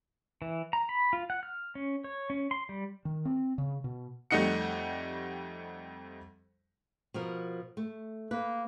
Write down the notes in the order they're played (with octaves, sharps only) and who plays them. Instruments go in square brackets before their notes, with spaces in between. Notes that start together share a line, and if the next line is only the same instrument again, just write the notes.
[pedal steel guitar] E3
A#5
B5
F4
F#5
F6
C#4
C#5
C#4
C6
G3
[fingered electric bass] D#3
C4
C#3
B2
[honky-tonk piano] F2 G3 A3 D#4 F#5 C#7
[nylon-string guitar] B2 F3 A#4
A3
[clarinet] A#3 [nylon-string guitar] B4